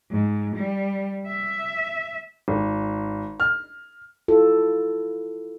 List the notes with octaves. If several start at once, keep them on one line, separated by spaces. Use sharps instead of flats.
G#2
G3
E5
G#1
F6
E4 F4 A4